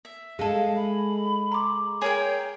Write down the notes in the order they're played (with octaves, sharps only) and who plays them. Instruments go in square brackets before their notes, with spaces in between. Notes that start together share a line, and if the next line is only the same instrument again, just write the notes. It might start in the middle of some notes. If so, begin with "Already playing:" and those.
[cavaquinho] E5
[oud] G#3 A4 [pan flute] F5
[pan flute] B5
[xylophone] A#5 C6 D6
[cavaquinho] G#4 A#4 G5 [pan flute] C#5